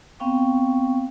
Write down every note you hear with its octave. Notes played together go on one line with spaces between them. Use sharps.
B3 C4 F5 G5 C#6